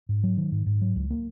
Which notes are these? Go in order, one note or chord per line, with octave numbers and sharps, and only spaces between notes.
G#2
F#3
D#3
G#2
G#2
F#3
C#2
A#3